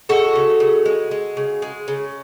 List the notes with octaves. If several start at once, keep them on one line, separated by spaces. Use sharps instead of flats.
G#3 F#4 A4
C#3
C#3
G#3
G#3
C#3
G#3
C#3